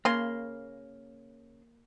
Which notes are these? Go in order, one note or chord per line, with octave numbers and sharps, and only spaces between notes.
C#3 A#3 C6